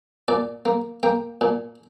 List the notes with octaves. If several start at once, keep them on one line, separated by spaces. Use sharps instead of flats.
A#2 D5
A#3
A#3 G5
A#2